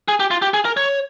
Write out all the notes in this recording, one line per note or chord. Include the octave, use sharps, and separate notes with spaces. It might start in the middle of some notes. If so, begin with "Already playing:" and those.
G#4
G4
F4
G4
G#4
A#4
C#5